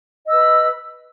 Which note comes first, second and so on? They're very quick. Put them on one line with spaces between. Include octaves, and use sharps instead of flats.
D#5 E6 B4 B5